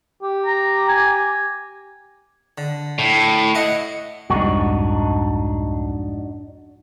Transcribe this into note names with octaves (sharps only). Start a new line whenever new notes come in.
G4
A#5
G#5
D3
A2
E4 D#5 F#5
C2 F2 G#2 D4 D#4 F#4